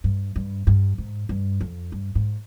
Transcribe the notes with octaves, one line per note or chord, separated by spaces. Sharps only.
G2
G2
G2
G#2
G2
F2
G2
G#2